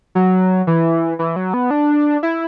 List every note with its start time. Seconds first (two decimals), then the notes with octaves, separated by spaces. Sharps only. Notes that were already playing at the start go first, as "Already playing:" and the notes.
0.15 F#3
0.67 E3
1.19 E3
1.36 F#3
1.54 B3
1.71 D4
2.23 E4